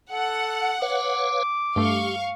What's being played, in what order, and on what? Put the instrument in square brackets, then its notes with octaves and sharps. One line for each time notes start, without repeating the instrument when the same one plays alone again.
[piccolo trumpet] A4 [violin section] F#5
[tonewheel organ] B4 C#5 F5 [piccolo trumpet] D6
[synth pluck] G2 A3 [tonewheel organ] G4 [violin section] F5 C#6